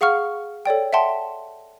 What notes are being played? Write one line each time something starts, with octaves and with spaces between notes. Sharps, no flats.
G#4 F5 F#5 C#6 F6
A4 C#5 D5 G5
E5 F#5 G5 A5 C6